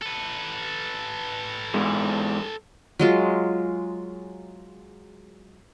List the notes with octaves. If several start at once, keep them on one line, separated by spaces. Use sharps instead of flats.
A4 B4
G#2 E3 G#3
F#3 G#3 F4